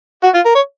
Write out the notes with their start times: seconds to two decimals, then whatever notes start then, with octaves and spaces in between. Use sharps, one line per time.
0.24 F#4
0.34 F4
0.45 A#4
0.55 C#5